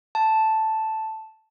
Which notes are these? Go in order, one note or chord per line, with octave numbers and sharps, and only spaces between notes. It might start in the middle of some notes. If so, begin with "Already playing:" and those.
A5